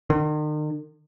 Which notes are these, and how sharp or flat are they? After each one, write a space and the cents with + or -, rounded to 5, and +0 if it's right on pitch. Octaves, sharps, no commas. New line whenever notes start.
D#3 -45